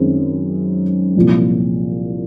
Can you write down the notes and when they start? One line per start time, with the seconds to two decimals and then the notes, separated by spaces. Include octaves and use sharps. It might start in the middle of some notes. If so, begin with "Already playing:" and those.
Already playing: F#2 D#3 G#3 C4
1.16 C2 A#2 F3